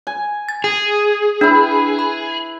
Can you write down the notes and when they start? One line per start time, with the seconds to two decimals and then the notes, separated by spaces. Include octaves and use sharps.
0.07 G#5
0.49 A6
0.64 G#4
1.41 D4 E4 B4 E5
1.99 B5